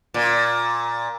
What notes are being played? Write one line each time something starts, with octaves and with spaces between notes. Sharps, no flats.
A#2